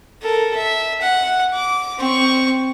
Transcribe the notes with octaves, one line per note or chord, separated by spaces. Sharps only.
A4 A#4
E5
F#5
D6
C4 C#6